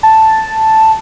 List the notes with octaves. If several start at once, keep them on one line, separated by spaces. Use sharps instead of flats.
A5